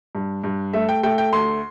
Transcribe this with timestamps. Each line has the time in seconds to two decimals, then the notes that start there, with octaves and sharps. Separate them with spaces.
0.15 G2
0.44 G2
0.73 A3 E5
0.89 G5
1.03 A3 G5
1.18 G5
1.33 D2 C6